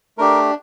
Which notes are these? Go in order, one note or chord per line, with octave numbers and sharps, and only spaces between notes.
A3 D4 G4 A#4